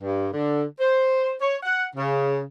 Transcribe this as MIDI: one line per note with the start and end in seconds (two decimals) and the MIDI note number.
0.01 0.27 43
0.33 0.63 50
0.79 1.33 72
1.40 1.57 73
1.63 1.84 78
1.96 2.41 49